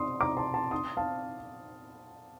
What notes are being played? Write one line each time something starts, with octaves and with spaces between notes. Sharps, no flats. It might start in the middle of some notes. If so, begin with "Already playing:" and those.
Already playing: C6 D#6
A#5 D6
A5 C6
A5 C6
C6 D#6
F5 A5